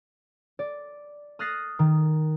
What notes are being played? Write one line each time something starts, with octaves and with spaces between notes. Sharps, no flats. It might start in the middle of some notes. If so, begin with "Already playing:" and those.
D5
D#6 F6 F#6 A6 A#6 C7
D#3